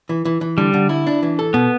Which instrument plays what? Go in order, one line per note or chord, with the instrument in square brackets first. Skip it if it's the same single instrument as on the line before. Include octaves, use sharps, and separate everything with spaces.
[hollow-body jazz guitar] E3
E3
E3
[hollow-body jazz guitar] D3 [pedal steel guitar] G3
[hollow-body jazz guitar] D3
E4
D4
E3
A4
[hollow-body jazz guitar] B2 [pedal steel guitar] B3